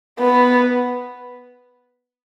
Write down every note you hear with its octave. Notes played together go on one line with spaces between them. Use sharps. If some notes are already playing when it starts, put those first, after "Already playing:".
B3